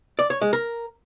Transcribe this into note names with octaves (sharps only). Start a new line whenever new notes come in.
D5
C#5
G#3
A#4